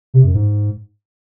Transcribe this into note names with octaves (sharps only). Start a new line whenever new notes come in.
C3
F#2
G#2